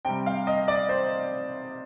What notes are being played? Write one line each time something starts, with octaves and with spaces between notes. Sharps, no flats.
C3 G3 G5
F5
D#5
D5
C5